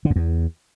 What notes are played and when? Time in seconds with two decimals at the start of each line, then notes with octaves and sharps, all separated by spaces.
0.05 D3
0.10 F2
0.16 E2